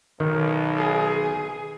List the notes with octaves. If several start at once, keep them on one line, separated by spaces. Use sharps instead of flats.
B1 D#3
G#4